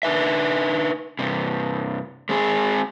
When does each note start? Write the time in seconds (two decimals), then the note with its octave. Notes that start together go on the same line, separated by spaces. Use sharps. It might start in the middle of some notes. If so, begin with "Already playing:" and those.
0.03 D4 D#4 B4 E5
1.19 G2 C3
2.29 G#3 C4 G#4